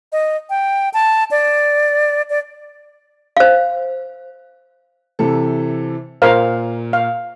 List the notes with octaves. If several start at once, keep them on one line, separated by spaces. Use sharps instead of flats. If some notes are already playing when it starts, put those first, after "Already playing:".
D#5
G5
A5
D5
D5
C5 F5
C3 E3 A4
A#2 A#4 C5 F5
F5